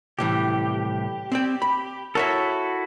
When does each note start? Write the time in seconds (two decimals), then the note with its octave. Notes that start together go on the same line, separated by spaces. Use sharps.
0.19 C2 A2 E3 G4
1.32 C4 D5 G5
1.62 B5
2.15 E4 F#4 A4 A#4 C#5 E5